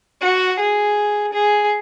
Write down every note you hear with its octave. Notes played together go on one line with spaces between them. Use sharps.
F#4
G#4
G#4